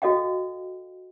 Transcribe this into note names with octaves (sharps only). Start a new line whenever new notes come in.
F#4 A4 D#5 F5 G5